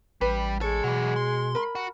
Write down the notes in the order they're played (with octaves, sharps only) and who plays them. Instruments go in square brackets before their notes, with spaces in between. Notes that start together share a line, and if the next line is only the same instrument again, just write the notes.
[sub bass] A1 [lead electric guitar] G3 [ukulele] B4
[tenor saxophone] G#3 [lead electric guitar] A4 [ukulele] C#5
[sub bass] B2 [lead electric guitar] E3 F#3
[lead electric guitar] C6
[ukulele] A#4 B5
[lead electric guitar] F#4